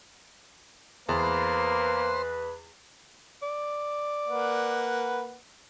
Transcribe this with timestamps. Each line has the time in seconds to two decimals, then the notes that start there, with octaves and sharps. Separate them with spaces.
1.09 E2 A#3 B4 C5
3.42 D5
4.28 A#3 B4 F#5